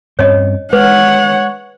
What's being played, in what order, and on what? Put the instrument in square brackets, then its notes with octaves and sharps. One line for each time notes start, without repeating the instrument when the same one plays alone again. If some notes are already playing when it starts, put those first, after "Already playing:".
[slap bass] G2 C4 C#4 [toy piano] C#5 D#5
[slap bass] G#3 [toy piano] B4 [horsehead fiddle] C#5 F#5